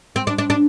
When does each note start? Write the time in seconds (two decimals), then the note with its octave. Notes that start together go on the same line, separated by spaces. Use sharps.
0.16 C4
0.27 D4
0.38 D4
0.50 D4